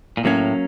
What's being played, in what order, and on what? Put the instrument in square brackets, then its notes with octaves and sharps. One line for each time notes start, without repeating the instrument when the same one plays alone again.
[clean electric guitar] A#2
[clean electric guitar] A2 [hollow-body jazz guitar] F#3 A#3 C#4